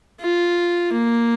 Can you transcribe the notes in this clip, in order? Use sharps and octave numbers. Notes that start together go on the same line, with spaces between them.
F4
A#3